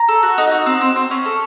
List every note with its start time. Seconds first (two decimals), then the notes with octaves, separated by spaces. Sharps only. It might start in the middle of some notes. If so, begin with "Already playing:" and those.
Already playing: A#5
0.08 A4
0.23 F#4
0.38 D#4
0.51 F#4
0.66 C4
0.81 C4
0.96 C4
1.11 C#4
1.25 A4